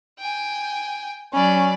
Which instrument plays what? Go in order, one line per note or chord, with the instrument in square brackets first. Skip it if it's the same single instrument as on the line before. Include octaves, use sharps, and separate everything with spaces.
[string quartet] G5 G#5
[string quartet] F#3 D5 B5 [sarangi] C#4